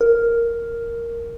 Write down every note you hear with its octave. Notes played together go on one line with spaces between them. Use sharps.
A#4